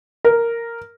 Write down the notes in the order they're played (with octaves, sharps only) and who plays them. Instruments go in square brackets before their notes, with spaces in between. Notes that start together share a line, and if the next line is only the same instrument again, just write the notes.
[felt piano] A#4